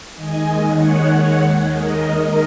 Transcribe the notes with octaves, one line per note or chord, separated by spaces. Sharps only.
D#2 D#3 G#3 D#5 G#5
C#5 F#5
A#4 D#5